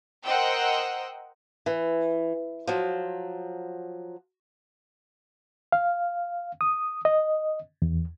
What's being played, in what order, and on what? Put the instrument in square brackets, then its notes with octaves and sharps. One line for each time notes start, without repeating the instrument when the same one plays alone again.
[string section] A#4 C5 D#5 F#5 G5 E6
[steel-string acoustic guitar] E3
F3 F#3
[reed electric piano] F5
D#6
D#5
E2